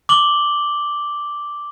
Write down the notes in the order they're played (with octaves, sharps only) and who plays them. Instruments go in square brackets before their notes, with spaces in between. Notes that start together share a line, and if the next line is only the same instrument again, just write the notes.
[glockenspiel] D6 F#7 G7